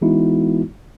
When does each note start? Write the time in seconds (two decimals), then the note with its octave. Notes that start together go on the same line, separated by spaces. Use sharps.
0.02 E3 G#3 B3 D#4 E4 F#4